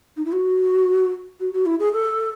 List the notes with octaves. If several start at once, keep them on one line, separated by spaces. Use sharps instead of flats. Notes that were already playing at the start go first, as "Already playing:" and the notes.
D#4
E4
F#4
F#4
F#4
E4
G#4
A4